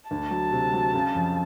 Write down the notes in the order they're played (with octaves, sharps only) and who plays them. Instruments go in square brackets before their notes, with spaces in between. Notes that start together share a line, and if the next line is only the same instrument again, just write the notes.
[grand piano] D2 [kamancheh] A5
[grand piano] F#3
C3
F#3
C#3
F2